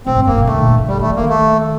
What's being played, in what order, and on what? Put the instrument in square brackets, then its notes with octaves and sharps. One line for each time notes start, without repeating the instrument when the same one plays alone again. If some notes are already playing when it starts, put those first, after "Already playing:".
[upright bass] A2 [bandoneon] C4
[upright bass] G2
[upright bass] G2 [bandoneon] A#3
[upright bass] C3
[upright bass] D3 [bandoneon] A3
[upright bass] A#2
G2
D3
[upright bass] D#3 [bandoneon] G3
[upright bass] D#3 [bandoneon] A3
[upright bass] F3
[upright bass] D#3 [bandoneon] A#3
[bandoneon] A3